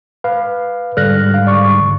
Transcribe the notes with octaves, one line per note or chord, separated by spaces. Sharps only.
B4 F5
G#2 D3 G3 F6 F#6 A#6
F5
D5 C#6